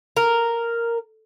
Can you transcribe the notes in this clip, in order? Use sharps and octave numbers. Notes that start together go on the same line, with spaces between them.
A#4